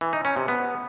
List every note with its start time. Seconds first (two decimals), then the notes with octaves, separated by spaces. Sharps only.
0.01 E3
0.13 D#4
0.25 C#4
0.37 C3
0.48 B3